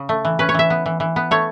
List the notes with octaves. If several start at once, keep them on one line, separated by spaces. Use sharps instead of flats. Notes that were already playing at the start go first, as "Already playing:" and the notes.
Already playing: C#3
A3
E3
C#4 B4
C#5
E3 E5
B3
E3
E3
B3
A3 C#5